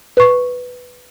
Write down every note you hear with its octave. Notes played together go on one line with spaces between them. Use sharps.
B4 C#6